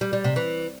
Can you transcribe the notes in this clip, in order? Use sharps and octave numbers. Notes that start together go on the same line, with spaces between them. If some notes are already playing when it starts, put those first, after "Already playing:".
G3
G3
C3
E3